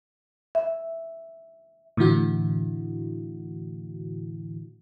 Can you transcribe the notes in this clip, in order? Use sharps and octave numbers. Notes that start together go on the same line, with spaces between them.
E5
A2 D3 E3 E4 F#4